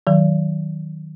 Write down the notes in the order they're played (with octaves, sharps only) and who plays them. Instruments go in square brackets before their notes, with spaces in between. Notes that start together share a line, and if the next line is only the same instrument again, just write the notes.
[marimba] D#3 F#3